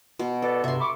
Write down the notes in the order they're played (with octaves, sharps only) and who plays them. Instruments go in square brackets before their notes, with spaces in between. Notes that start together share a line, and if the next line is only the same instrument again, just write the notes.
[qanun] B2
[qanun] A4 [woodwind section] B4 D5
[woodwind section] G2 C3 [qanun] E5 C6
[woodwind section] B5 C#6 D6